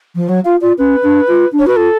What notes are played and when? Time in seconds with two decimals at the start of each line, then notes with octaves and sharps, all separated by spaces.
0.15 F3
0.28 F#3 C#5
0.44 F4 F5
0.60 F4 D5
0.78 C#4 B4
1.03 D4
1.27 F4
1.52 D4
1.59 C#5
1.66 F#4 B4
1.76 F4 A4